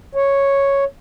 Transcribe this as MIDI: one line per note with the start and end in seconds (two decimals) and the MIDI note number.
0.15 0.85 73